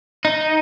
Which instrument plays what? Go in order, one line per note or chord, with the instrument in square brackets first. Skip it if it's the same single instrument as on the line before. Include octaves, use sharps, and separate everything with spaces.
[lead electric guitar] D#4